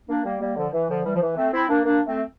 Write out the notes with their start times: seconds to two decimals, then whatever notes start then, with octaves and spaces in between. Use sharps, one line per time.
0.09 A#3 D4
0.25 G3 A#3
0.41 G3 A#3
0.57 D3 F3
0.73 E3
0.89 D3 F3
1.05 E3 G3
1.16 F3
1.22 E3
1.37 A3 C4
1.53 C4 E4
1.69 A#3 D4
1.85 A#3 D4
2.06 A3 C4